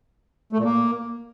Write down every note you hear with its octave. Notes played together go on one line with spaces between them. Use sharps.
A3
A#2
A#3